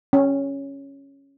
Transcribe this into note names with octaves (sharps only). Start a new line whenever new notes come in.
C#4